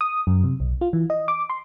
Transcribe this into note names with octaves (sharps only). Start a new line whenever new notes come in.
D#6
F#2
C3
B1
F4
E3
D#5
D6
C6